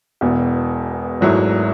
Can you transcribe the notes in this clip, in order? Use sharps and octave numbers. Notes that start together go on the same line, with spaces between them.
E1 E2 B2
G#1 G#2 F#3 A3 E4